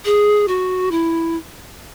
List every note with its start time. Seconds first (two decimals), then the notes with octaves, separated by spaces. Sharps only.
0.05 G#4
0.48 F#4
0.91 E4